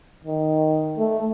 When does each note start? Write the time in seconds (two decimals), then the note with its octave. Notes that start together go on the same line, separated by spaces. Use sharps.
0.24 D#3
0.98 A3